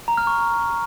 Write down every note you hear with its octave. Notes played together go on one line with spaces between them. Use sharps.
A#5
F6
C#6